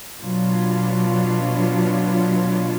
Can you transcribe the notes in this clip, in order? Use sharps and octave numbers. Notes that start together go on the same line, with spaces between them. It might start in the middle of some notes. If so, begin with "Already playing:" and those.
B2 F#3 B3 D4 F4